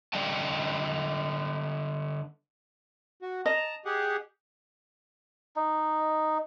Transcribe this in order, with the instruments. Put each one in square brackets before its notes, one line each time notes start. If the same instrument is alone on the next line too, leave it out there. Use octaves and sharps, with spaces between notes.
[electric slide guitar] D3 G3 D5 D#5 G5 A5
[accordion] F#4
[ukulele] D#5 [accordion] A5 A#5
[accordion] G4 G#4 F#5
[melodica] D#4